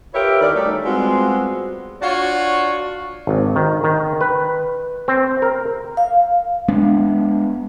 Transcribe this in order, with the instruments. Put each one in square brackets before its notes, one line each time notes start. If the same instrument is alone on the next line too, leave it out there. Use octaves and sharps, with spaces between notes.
[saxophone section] F4 G4 A#4 B4 C#5 E5
E2 D#3 C#4 A#4 D5
G3 A3 C#4 D#4 F#4 A4
G3 G#3 B3 C4 F4 F#4
[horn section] D4 F4 F#4 C#5
[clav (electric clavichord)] G#1
D#3
D#3
B4
C4
A#4
[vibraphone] F5
[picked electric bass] G#3 B3 D4